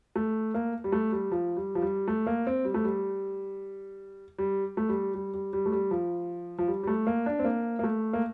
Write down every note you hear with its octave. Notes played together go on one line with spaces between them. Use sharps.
A3
A#3
G3
A3
G3
F3
G3
F3
G3
A3
A#3
C4
G3
A3
G3
G3
A3
G3
G3
G3
G3
A3
G3
F3
F3
G3
G3
A3
A#3
D4
C4
A#3
A#3
A3
A#3